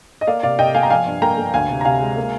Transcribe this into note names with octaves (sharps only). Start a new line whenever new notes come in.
D#5
A#3 D5 F5
C3 D5 F5
C3 D#5 G5
A#3 F5 G#5
A#5
F3 F5 G#5
G2
A#3 G5 A#5
A#3
D2 F5 G#5
C3
A#5
C3 F5 G#5
G#3
A#3